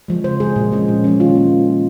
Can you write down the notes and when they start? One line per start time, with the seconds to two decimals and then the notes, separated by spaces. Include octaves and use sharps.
0.08 F3 G#3
0.24 C#3 C5
0.40 F3 G#3 G#4
0.56 A#2
0.72 F3 G#3 C#4
0.88 A#2
1.04 F3 G#3 C#4
1.20 D#3 F4
1.35 A#3 C#4
1.51 D#3
1.67 A#3 C#4